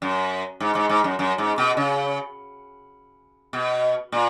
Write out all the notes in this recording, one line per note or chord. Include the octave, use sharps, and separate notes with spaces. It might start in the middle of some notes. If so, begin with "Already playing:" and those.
F#2
G#2
G#2
G#2
F#2
F#2
G#2
B2
C#3
B2
A#2